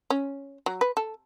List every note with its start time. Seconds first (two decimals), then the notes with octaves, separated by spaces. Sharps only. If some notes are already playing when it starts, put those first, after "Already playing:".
0.10 C#4
0.66 F#3
0.81 B4
0.97 A4